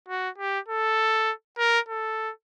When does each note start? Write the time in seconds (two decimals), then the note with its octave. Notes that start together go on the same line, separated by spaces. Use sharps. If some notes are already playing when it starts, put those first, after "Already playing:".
0.08 F#4
0.38 G4
0.68 A4
1.58 A#4
1.89 A4